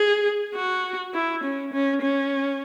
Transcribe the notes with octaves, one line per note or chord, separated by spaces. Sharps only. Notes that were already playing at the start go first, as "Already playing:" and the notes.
Already playing: G#4
F#4
E4
C#4
C#4
C#4